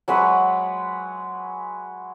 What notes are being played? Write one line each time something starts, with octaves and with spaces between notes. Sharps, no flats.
F#3 G#3 B4 F#5